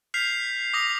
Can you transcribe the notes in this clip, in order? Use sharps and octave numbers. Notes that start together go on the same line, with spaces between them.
F6 G6 B6 C7 F7
D6 D#6 A#6 F7